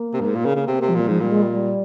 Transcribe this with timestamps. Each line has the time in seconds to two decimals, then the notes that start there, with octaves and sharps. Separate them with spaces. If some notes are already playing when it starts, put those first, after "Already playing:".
Already playing: A#3
0.14 C3
0.20 G2
0.25 G#2
0.35 A#2
0.45 C#3
0.56 C#3
0.67 C3 C4
0.78 C3 A#3
0.88 F3
0.95 A#2 G3
1.08 G#2 F3
1.20 A#2 G3
1.31 G#3
1.41 G3
1.52 G3